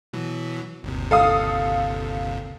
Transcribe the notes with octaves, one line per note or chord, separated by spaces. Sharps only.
B2 E3 F#3
G1 D#2 C3
A4 F5 D#6